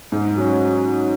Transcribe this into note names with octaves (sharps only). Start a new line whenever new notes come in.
G#2
F#3 C#4